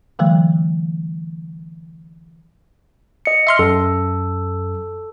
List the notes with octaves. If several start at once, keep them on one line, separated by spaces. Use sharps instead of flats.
D3 E3 F#3 A3
D#5 C#7
E5 C6 F6
F#2 A4